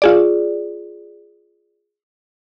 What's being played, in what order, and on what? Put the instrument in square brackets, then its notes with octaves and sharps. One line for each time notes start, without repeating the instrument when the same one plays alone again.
[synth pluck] F4 G#4 D5